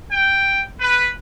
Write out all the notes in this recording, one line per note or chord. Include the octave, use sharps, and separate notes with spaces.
G5
B4